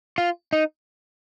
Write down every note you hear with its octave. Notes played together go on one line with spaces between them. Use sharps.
F4
D#4